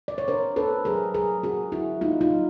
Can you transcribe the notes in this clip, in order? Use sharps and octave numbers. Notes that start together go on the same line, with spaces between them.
D5
C#5
D4 A#4 C5
D4 A4 B4
F#3 G#4 A#4
F#3 G#4 A#4
D4 F#4 G#4
D3 E4 F#4
A#3 D#4 F4
D#4 F4
F#3